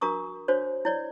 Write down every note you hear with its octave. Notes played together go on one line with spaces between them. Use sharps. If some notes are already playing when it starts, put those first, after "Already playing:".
D4 F#4 A#4 A#5 C#6 D#6
D4 F#4 C5 C#5
E4 C#5 D5